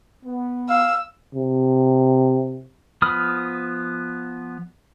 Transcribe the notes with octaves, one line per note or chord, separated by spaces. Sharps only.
B3
F5 E6
C3
F3 B3 B5 D#6 F6